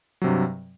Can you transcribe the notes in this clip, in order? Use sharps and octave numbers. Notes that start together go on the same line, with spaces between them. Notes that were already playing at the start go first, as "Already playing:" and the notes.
G2 C3 F#3